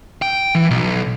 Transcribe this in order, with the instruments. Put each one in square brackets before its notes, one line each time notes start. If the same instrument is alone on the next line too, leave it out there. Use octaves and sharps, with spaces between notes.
[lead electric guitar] G5
E3
B1